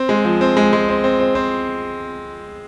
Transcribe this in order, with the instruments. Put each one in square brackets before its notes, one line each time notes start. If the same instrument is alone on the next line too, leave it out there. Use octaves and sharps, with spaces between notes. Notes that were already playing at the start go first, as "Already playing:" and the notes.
Already playing: [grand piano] C4
G#3
F3
C4
G#3
G#3
C4
C4
C4
C4